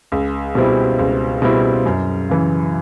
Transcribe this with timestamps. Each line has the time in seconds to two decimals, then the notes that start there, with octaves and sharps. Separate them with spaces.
0.12 C#2
0.55 B2 G3 C4 E4
0.99 C#2
1.42 B2 G3 C4 E4
1.85 F#2
2.30 C#3 E3